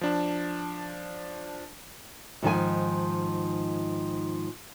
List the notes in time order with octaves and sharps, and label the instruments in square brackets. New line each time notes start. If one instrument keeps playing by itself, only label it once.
[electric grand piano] F3 D4 A5
[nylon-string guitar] G#2 D#3 F3 G#5